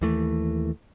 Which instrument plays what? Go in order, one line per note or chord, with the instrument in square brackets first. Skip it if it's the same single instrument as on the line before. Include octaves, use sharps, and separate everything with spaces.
[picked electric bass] D#2 E3 A3